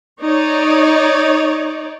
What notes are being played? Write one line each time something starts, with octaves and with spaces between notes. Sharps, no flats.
D#4 C#5 D5